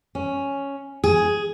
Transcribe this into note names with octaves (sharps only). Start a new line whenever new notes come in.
C#4
G#4